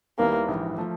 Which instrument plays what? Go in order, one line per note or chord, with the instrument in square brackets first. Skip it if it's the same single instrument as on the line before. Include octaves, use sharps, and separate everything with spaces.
[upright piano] D#2 D#3 G3 B3 E4 [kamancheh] A#3
[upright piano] A#1 G#2 E3
F3 A3